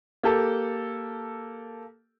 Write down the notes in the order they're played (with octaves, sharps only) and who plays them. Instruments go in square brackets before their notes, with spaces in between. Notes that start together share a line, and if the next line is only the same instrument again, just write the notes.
[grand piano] A#3 G4 A4